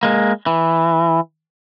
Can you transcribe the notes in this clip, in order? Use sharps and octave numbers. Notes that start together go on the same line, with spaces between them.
G#3 A#3
E3